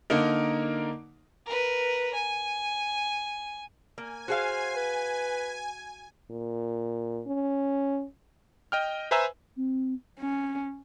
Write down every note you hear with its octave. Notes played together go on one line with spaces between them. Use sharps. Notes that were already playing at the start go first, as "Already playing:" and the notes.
D3 A#3 D#4 A#4
A#4 B4
G#5
A#3 G#5
F#4 G#4 C5 F5
B4
A#2
C#4
D#5 G5 F6
B4 C5 E5 G#5 A#5 E6
C4
C#4